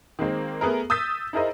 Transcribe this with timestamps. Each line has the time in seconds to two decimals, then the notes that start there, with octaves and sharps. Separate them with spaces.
0.19 D#3 G#3 A#3 C4
0.61 A3 B3 G#4 A#4
0.90 D#6 E6 G6 A6 B6
1.33 D#4 E4 G#4 A#4 C5 D#5